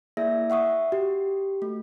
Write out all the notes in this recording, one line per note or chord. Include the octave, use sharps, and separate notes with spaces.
A#3 E4 G#4 D5 E5 A#6
E5 F#5 C#6 D#6
F#4 G4
A3